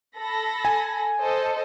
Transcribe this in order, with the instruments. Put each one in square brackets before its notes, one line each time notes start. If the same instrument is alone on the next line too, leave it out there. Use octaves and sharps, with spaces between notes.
[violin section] A4 B5 A#6
[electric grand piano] G#5
[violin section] A4 C5 D#5